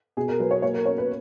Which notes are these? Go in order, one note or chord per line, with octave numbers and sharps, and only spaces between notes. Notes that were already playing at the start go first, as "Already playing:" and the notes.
B2 G#4
A#4
F#3 B4
C#5
A#3 C#5
A#4
C#4 C#5
B4